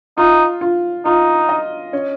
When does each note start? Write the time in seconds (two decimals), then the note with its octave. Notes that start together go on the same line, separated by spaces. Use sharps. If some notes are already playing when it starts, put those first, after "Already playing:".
0.18 D#4 F4
0.61 F4
1.05 D#4 F4
1.49 D#5
1.93 C#4